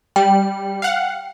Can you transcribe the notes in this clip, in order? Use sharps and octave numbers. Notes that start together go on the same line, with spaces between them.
G3 G5
F5 F#5